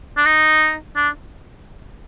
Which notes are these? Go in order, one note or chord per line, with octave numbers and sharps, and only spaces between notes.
D4
D#4
D4